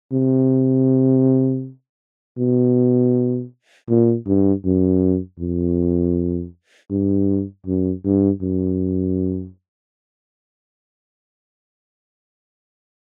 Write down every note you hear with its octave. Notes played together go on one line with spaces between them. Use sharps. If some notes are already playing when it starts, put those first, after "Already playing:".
C3
B2
A#2
G2
F#2
F2
G2
F#2
G2
F#2